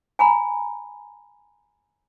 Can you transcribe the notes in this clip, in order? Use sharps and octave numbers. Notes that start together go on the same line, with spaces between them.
G#5 A#5 B5